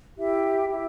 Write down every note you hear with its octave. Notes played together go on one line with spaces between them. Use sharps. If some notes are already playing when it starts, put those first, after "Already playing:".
E4 G4 E5
E4 G4 E5